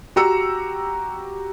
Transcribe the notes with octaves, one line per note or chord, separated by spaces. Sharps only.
F#4 G4 A#5 E6 C#7